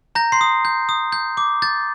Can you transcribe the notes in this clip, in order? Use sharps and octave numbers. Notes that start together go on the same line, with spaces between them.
A#5 G6 A#6
C6 C7
D#6
G6
D#6
G6
D6
G6 A6